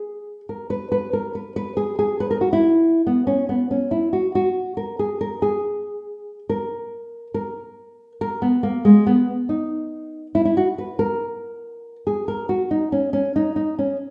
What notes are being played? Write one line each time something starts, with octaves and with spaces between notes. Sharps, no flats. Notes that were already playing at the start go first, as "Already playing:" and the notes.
Already playing: G#4
A#4
B4
B4
A#4
B4
B4
G#4
G#4
B4
A#4
F#4
E4
B3
C#4
B3
C#4
E4
F#4
F#4
A#4
G#4
A#4
G#4
A#4
A#4
A#4
B3
A#3
G#3
B3
D#4
E4
E4
F#4
B4
A#4
G#4
A#4
F#4
D#4
C#4
C#4
D#4
D#4
C#4